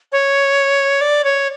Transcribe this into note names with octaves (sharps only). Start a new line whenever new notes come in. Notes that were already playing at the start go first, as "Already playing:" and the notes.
C#5
D5
C#5